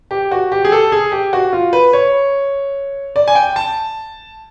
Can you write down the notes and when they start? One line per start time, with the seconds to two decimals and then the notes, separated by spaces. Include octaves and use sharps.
0.11 G4
0.32 F#4
0.52 G4
0.65 G#4
0.72 A4
0.92 G#4
1.12 G4
1.33 F#4
1.53 F4
1.73 B4
1.93 C#5
3.16 D5
3.28 G#5
3.35 G5
3.56 A5